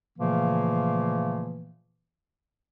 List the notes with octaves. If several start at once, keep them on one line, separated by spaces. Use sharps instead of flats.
A#2 C#3 E3 F3 A3 A#3